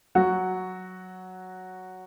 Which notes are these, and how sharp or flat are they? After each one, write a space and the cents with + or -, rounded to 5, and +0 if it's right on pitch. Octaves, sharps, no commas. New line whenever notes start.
F#3 +0 F#4 +0